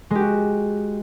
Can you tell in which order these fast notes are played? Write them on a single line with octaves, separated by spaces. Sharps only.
G#3 G4 F#4